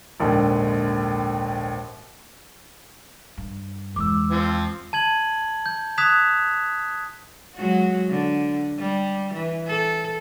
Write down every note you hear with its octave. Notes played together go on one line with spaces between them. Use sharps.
A#1 D#2 G#2 D3
G2
E2 G#3 D6 E6
F3 C4
A5 G#6 F#7
G6
D#6 F#6 G#6 B6 E7 F7
F#3 G#3 F#4
D3
G3
E3
A4